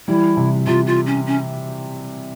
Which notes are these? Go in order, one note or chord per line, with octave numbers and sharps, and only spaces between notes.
E3 G3 E4
C3
C3 F4
F4
C#4
C#4